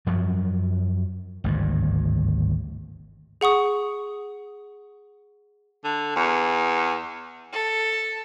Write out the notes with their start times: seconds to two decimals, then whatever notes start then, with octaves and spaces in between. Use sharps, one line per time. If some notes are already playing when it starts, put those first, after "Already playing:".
0.07 F#2 F3 F#3
1.44 G#1 D2 G2
3.41 G#4 F#5 C#6 D#6
5.85 D3
6.16 E2
7.52 A4